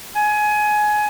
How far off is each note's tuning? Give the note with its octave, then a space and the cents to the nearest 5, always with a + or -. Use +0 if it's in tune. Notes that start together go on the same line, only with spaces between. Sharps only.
G#5 +20